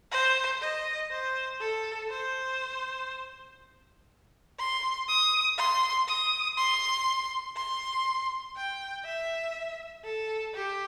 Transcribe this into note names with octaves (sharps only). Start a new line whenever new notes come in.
C5
D#5
C5
A4
C5
C6
D#6
C6
D#6
C6
C6
G5
E5
A4
G4